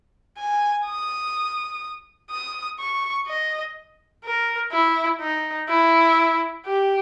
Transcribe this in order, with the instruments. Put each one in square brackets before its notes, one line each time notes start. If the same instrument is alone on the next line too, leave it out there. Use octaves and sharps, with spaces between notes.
[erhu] G#5
D#6
D#6
C#6
D#5
A#4
E4
D#4
E4
G4